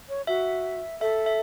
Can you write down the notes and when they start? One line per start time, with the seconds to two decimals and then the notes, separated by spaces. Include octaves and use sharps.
0.09 C#5
0.27 F#4 E5
1.01 A4 E5
1.26 E5